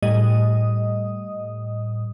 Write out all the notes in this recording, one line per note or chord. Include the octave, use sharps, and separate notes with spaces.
A2 G3 D#5 D#6